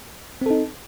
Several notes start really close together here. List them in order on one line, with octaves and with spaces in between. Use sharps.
C4 A4 D#4